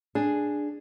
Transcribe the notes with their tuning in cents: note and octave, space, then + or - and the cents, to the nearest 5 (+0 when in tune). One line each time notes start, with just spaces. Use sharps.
D4 +5 G#4 +0